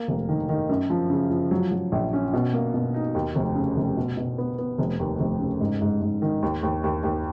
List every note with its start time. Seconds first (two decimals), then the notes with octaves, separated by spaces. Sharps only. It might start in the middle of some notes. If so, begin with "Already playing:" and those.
Already playing: A#3
0.08 F1
0.29 D#3
0.49 D#3
0.69 F#2
0.90 F3
1.10 C#3
1.30 F3
1.51 F#3
1.72 F#3
1.92 A#1
2.13 C#4
2.33 B2
2.53 A#3
2.74 B2
2.94 D#4
3.15 D#2
3.35 F1
3.55 C#3
3.76 F1
3.97 B2
4.17 B2
4.38 B3
4.58 B3
4.78 F1
4.99 D#2
5.20 F1
5.39 C#3
5.61 G#2
5.82 G#2
6.01 G#2
6.22 D#3
6.42 D#2
6.63 D#2
6.84 D#2
7.03 D#2